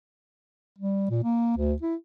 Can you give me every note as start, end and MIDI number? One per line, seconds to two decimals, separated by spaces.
0.78 1.09 55
1.10 1.21 46
1.24 1.55 58
1.57 1.74 38
1.82 1.95 64